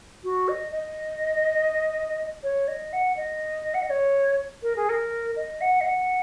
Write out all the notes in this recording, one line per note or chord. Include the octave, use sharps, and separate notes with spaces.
F#4
D#5
D#5
C#5
D#5
F#5
D#5
F#5
D#5
C#5
A#4
G#4
A#4
D#5
F#5
D#5
F#5